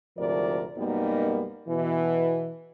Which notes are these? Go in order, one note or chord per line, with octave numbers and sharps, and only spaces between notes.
D2 G#2 C3 F3 A#4 D5
F#2 B2 G3 A#3 B3 D#4
B2 E3